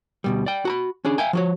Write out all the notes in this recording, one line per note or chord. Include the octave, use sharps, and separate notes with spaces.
D2 B2 G3
D5 G5
F#4 A#5 B5
C#4 D4 G#4
E5 F5 G5 G#5
F3 F#4 C#5